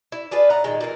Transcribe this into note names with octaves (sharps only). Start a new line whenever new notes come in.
E4
D4 F4 G#4 B4
A2 F#5 A#5
A#2 D#3 G#3
A#2 E3 A#3